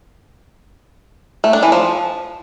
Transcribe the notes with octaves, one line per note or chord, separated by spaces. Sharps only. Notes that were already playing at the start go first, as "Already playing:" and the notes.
A3
D4
E3
F3